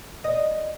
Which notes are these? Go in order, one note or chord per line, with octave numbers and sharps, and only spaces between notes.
D#5